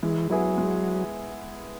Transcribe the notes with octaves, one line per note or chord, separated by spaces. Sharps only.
E3 G#3
F#3 B3 E4 G#4
G#3